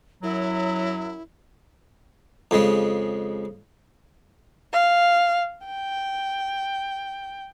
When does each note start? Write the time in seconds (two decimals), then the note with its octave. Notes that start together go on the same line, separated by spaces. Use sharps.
0.23 F#2 F#3 E4
2.51 F2 C#3 G#3
4.73 F5
5.66 G5